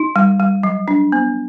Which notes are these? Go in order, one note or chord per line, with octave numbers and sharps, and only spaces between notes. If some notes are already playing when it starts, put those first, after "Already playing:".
Already playing: D#4
G3
G3
F#3
D4
B3